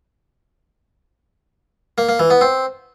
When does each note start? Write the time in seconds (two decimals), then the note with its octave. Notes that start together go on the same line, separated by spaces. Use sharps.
1.98 A#3
2.09 A#3
2.20 E3
2.30 B3
2.41 C4